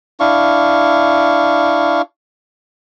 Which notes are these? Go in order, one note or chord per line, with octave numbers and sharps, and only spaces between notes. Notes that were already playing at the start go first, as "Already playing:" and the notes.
D4 E4 F5 C#6